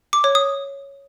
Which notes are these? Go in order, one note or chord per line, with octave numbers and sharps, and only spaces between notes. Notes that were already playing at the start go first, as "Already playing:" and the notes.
D6
C#5
D#6